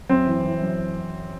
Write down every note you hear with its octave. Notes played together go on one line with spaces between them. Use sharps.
F#2 C4
E3
E3
F#2